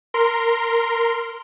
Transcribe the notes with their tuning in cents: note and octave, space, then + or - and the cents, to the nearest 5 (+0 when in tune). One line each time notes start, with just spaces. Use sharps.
A#4 -5 C6 -10